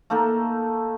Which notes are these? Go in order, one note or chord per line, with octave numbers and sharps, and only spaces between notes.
A3 A#3 D#4 A4